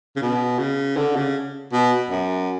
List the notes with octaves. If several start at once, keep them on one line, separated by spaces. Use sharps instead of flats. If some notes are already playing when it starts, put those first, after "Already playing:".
C#3
B2
C#3
D3
C#3
B2
F#2